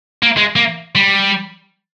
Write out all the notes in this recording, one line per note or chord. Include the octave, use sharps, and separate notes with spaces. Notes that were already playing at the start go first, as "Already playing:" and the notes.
A#3
G#3
A#3
G3